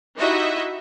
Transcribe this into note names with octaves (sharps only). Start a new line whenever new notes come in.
D#4 E4 F#4 G4 D#5 E5